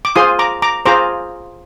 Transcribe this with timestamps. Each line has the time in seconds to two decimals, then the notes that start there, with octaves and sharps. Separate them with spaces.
0.05 D6
0.16 F4 G#4 C5 C6 D#6
0.39 A#5 D6
0.62 A#5 D6
0.86 F4 G#4 C5 A#5 D6